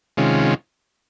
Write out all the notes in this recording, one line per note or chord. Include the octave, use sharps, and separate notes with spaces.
C3 D#3 G#3 C#4 F4